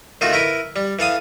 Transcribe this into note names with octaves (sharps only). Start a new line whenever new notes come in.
D#3 A3 D#4 F4 F#4
E4 A#4 B4
G3
E3 A4 F5 D#6